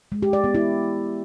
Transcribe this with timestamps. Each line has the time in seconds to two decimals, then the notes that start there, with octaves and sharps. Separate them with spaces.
0.12 G#3
0.22 G4
0.33 D5
0.44 B3
0.55 E4